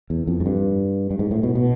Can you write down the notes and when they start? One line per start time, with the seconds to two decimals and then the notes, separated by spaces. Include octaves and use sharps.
0.10 E2
0.27 F2
0.40 G#2
0.46 G2
1.11 G2
1.19 G#2
1.31 A2
1.43 B2
1.55 B2